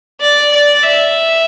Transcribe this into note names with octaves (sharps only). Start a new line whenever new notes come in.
D5
D5
E5